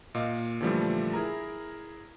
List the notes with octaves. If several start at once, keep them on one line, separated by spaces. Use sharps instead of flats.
A#2 A#3 D#5 F5
A#2 D3 E3 F3 G3 A3
E4 G#4 A#4 A#5